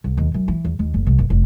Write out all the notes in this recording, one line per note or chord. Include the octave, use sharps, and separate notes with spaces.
C2
D#2
F#2
E3
E2
D#2
F#1
C2
F#1
F1